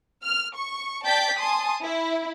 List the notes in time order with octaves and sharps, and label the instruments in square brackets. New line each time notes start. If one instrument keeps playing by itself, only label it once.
[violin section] F6
C#6
D5 G5 A5 G6 A6 B6
G#5 A5 C6 D#6
E4